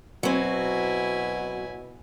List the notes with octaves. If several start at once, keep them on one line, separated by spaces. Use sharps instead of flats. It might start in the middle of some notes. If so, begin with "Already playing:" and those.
B2 F#3 C4 E4 G#5